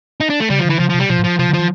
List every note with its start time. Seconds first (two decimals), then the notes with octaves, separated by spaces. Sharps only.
0.20 D#4
0.30 D4
0.40 A3
0.50 C#3 G3
0.60 F3
0.65 D3 E3
0.79 C#3 F3
0.90 F3
0.94 C3
0.99 G3
1.09 B2 F3
1.19 A2
1.24 F3
1.39 C3 F3
1.49 D3
1.54 F3
1.59 E3